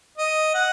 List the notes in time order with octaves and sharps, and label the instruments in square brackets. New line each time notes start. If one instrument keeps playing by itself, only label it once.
[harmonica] D#5
F#5